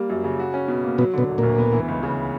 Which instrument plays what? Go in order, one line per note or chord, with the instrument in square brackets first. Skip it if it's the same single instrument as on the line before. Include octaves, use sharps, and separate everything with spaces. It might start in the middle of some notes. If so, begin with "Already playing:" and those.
Already playing: [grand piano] G3 A#3
F#2
C#3
F#4
C#4
B2
A#3
[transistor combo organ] B2 B3 [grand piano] F#3
[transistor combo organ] B2 B3 [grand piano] D3
[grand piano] E1
[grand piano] D2 [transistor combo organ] A#2 A#3
[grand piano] B3
E3
C#2
C#3